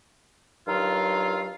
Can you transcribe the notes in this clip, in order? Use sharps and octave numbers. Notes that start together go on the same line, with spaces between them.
G2 D#3 F#3 F4